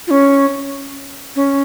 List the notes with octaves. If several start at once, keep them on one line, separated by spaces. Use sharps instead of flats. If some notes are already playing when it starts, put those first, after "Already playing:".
F4
C#4
C#4